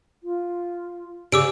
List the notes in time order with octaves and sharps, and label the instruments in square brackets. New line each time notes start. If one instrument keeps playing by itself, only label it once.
[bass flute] F4
[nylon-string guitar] C#3 D5 [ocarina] G4 [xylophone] D6 E6 D7